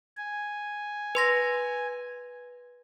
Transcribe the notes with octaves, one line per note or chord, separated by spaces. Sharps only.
G#5
B4 C6 A#6